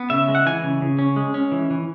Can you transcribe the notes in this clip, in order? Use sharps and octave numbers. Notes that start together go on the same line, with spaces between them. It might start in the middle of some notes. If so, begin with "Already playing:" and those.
Already playing: B3
C#3 E5
G#3
F#5
E3 G#5
C#3
C#3
C#4
G#3
C#4
E3
E3